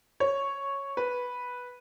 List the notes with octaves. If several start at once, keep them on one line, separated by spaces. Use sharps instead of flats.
C#5
B4